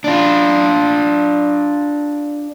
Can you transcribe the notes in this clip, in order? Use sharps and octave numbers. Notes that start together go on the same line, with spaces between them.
D4 F4